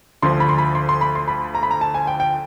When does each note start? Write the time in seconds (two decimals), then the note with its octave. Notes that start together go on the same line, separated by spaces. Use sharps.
0.22 D2 D3 F3 C6
0.40 B5
0.49 C6
0.58 B5
0.75 C6
0.89 C6
1.01 B5
1.15 C6
1.28 B5
1.55 A#5
1.63 B5
1.71 A#5
1.81 A5
1.94 G#5
2.07 G5
2.20 G5